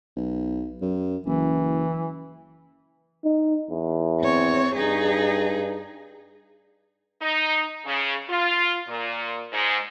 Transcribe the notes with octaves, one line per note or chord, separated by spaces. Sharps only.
B1
F#2
F#1 E3
D#4
E2
C4 C#5
G2 D#4 G#4
D#4
C#3
F4
A#2
G#2